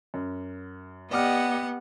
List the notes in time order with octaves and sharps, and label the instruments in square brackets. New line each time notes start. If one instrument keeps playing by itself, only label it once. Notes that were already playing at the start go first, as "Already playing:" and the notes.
[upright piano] F#2
[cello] B3 [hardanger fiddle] G4 D#5 [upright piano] D5 D6 F6 [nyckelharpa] F#5